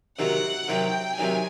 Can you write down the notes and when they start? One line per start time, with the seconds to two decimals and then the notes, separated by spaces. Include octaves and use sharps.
0.19 C3 D#3 F#3 F#5
0.68 C3 D#3 F#3 G5
1.18 C3 D#3 F#3 G#5